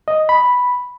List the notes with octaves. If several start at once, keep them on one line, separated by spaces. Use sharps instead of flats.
D#5
B5